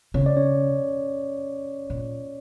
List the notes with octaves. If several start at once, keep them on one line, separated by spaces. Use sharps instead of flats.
C#3 C#5
D5
C#4 C#5
A#2